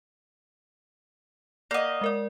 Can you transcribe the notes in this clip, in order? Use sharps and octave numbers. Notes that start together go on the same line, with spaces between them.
A#3 D5 D#5 F#5
G#3 A#4 D5